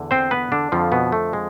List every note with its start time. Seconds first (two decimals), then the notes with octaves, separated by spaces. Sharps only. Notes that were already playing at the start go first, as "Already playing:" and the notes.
Already playing: E2 D3
0.11 C4 C5
0.31 B3 B4
0.52 D3 D4
0.72 F2 D3 F3 F4
0.92 B2 B3
1.12 A3
1.33 G#3